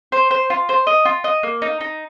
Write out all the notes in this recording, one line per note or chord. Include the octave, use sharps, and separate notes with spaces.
C5
C5
F4
C5
D#5
F4
D#5
A#3
D#4
D#4